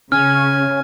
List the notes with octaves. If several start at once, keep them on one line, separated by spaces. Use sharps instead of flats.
C#3 C#4 G#5 F6